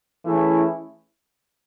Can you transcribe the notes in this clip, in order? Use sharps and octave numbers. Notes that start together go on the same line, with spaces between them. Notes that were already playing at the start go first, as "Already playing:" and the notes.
E3 A3 C#4 E4 G#4